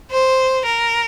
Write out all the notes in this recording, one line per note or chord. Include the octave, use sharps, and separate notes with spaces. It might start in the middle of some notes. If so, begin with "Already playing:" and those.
C5
A#4